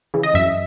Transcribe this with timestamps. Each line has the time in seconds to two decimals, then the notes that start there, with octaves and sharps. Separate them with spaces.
0.14 C#3 E3
0.23 D#5
0.34 F#2 E5